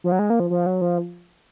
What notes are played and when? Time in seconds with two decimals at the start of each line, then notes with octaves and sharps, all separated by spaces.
0.04 F3
0.12 F#3
0.19 G#3
0.30 A#3
0.40 F3
0.50 F3
0.66 F#3
0.81 F3